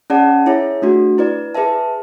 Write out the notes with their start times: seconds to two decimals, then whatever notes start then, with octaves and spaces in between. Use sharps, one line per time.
0.10 C#4 G#4 D5 F#5 A5
0.46 E4 G#4 C#5 E5
0.82 A3 D4 F#4
1.18 E4 B4 D5
1.55 G#4 B4 E5 A5